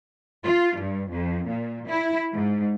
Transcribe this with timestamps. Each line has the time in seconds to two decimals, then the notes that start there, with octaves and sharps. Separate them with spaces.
0.44 F4
0.79 G2
1.11 F2
1.48 A#2
1.87 E4
2.33 G#2